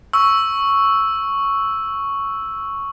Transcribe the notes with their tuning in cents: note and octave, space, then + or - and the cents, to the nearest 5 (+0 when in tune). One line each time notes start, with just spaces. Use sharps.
C#6 +0 E6 +0